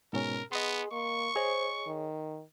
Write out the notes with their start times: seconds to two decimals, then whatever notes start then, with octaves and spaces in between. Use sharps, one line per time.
0.13 G#2 B2 C#4 A#4
0.52 B3 G#4 D#5 C6
0.92 A#3 C#6
1.36 G#4 C5 C#5 D#5
1.87 D#3